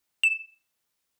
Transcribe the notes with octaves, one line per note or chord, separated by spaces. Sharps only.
E7